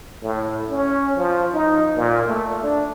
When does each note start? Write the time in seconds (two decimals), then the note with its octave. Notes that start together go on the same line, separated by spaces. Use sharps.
0.23 A2
0.70 C#4
1.17 F3
1.53 D#4
1.96 A#2
2.27 A3
2.63 D4